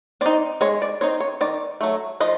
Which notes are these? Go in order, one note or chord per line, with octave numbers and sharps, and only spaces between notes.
C4 D#4 D5
G#3 C#5
D5
C4 D#4 C#5
C#5
D#3 D5
F#3 A3
F3 D#5